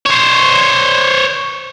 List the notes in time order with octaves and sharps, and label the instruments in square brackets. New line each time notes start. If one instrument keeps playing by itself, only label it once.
[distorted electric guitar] C5 C#5